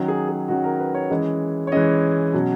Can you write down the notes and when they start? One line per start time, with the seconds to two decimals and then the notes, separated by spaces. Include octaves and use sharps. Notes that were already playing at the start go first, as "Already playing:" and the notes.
Already playing: D#3 F#3 C#4
0.08 G#4
0.29 G#4
0.48 D#3 F#3 C#4 F#4
0.64 A#4
0.80 B4
0.94 C#5
1.10 E3 G#3 C#4 D#5
1.67 C#5
1.72 E3 G#3 C#4 D#5
2.33 B2 F#3 C#4